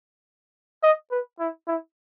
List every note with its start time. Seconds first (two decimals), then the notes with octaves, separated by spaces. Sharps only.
0.83 D#5
1.12 B4
1.39 E4
1.68 E4